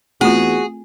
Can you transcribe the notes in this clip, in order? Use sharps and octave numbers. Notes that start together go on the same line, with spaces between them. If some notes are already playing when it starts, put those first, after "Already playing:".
E2 A3 C4 F4 F#4 G#4